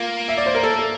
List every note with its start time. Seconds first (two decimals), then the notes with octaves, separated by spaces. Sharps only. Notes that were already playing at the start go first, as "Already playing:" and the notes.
Already playing: A#3 F4
0.28 E5
0.38 D5
0.46 C5
0.55 A#4
0.63 A4
0.79 A4